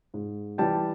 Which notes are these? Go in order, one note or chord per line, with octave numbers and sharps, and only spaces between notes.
G#2
E3 G3 G5 A5